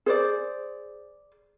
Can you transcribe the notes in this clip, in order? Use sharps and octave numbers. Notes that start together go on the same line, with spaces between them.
G#4 C5 D5